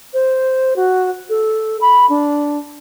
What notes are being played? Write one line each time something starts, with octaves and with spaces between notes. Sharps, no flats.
C5
F#4
A4
B5
D4